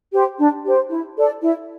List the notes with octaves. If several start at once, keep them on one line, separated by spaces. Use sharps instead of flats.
G4 C5
D4
G4 C5
E4
A4 D5
E4